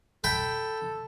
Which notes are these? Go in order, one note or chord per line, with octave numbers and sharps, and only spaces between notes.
A4 G5 B5